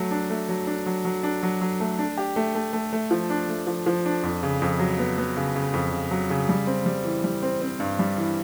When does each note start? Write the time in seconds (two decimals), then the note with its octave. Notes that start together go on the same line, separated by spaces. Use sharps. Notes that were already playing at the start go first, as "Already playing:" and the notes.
Already playing: F#3 A3
0.11 D4
0.30 A3
0.49 F#3
0.67 D4
0.86 F#3
1.05 F#3
1.23 D4
1.43 F#3
1.61 F#3
1.80 A3
1.99 D4
2.18 G4
2.36 A3
2.55 A3
2.73 A3
2.93 A3
3.11 F3
3.30 D4
3.49 A3
3.67 F3
3.86 F3
4.06 D4
4.23 F2
4.43 C#3
4.62 F2
4.79 F#3
4.99 B3
5.18 B3
5.37 C#3
5.56 C#3
5.74 F2
5.92 C#3
6.11 F#3
6.30 C#3
6.49 G3
6.67 C4
6.86 G3
7.04 E3
7.24 G3
7.42 C4
7.62 C4
7.80 G2
7.99 G3
8.17 E3